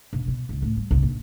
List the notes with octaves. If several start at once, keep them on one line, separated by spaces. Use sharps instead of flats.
E1
B2
C#2
A2
G3
C2
A#1